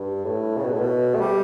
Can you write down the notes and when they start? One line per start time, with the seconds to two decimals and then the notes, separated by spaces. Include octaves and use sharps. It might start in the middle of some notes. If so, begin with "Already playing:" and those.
Already playing: G2
0.25 A2
0.57 C#3
0.64 B2
0.73 A2
0.81 B2
1.15 A3
1.21 G3